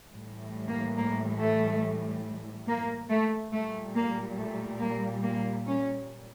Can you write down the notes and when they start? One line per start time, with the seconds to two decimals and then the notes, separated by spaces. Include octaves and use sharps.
0.11 A2 E3 G3
0.68 A#3
0.97 A#3
1.39 A3
2.68 A#3
3.10 A3
3.52 A#2 G3 A3
3.96 A#3
4.39 A3
4.80 A#3
5.23 A#3
5.66 C#4